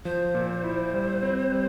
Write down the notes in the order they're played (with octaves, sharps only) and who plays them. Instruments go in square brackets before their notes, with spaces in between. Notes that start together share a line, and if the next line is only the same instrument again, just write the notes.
[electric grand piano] F3 [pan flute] C5
[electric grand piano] A#2
E4
G3
C4
G3